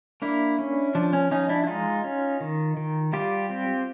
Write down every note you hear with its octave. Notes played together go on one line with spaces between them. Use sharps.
A#3 D4 E4
C#4
F3 D4
C#4
F3 C#4 D#4
D4 E4
E4
G#3 D#4 F4
C#4
D#3
D#3
G3 F4 G4
C4